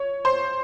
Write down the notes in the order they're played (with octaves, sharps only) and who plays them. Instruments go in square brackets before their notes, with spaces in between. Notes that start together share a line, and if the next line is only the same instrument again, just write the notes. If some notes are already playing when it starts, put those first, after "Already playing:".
Already playing: [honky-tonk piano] C#5
C5 C6